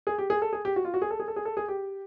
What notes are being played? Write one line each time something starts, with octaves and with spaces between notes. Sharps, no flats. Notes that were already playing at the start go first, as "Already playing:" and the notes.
G#4
G4
G#4
A4
G#4
G4
F#4
F4
F#4
G#4
A4
G#4
A4
G#4
A4
G#4
G4